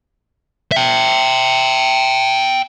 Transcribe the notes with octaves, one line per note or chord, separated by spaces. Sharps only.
E5 G5